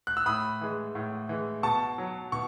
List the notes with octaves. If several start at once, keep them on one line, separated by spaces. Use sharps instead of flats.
F#6
E6
A2 B5 D#6
E3 G#3
A2
E3 G#3
B2 A5 C#6
F#3
B2 C#6